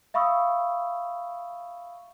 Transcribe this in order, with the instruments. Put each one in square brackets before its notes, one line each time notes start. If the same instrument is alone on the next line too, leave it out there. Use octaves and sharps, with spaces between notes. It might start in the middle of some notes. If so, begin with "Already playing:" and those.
[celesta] E5 F5 B5 C#6 D#6 E6